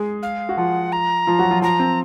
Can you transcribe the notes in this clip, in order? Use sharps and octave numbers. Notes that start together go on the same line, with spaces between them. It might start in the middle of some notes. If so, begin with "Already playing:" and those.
Already playing: G#3 G#4
F5
F#4
F3 F4 F#5
A#5
F3 F4
F#3 F#4
F3 F4
F3 F4 A#5
C4